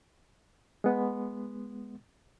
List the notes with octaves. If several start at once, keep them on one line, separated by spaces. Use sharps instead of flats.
G#3 B3